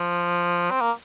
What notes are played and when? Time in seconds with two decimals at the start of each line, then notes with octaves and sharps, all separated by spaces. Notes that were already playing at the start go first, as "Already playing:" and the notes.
Already playing: F3
0.71 C4
0.81 A#3